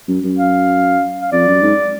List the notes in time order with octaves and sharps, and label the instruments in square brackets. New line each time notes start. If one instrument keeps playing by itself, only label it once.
[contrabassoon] F#2
F#2
[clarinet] F5
F5
[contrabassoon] F2 [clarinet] D5
[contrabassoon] F#2
G#2